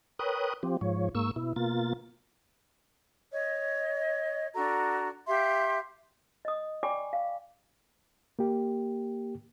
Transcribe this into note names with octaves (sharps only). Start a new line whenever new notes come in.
A#4 B4 C#5 G5 D#6 F#6
F3 C4 G4
G#2 F3 C#5
G#2 A#3 C#6 E6
B2 E4
B2 A#3 F4 A6
C#5 D#5
D4 F#4 A4 A#5
G4 E5 F5 C6
D#5 D#6
D5 G5 G#5 B5 C#6 D6
F5
A#3 G4